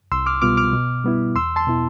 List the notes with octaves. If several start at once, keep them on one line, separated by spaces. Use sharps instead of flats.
C2 C6 E6
D6 F6
B2 G3 B3 F4 D6 F6
D6 F6
B2
G3 B3 E4
E2 C6 E6
A5 C6
B2 B3 E4